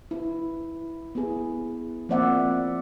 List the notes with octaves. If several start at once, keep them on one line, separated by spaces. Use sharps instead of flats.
E4
B3 E4 G#4
F3 A#3 C4 D5 E5 F#5